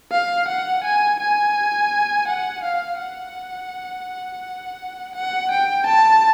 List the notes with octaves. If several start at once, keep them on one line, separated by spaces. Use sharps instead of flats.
F5
F#5
G#5
G#5
F#5
F5
F#5
F#5
G5
A5